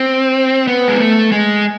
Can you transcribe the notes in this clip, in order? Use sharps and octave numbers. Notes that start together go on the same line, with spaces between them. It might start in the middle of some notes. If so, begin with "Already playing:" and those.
Already playing: C4
B3
G#3
A3
G#3